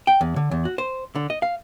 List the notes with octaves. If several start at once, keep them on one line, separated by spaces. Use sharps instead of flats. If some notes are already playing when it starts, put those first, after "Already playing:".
G5
E2
D3
E2
F#4
C5
D3
D#5
F5